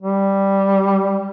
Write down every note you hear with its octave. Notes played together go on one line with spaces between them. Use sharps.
G3